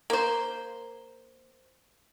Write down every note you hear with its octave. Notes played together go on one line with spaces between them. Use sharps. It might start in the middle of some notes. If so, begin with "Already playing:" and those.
A#3 C5